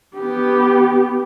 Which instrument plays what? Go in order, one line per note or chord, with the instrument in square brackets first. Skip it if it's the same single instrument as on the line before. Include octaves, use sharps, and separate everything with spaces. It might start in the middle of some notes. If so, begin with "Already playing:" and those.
[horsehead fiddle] B3 G4